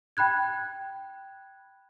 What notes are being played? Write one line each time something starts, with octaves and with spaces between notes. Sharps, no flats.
G5 B5 F#6 G#6